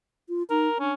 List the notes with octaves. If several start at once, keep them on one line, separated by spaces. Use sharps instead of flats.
F4
D#4 A#4
C#4 D4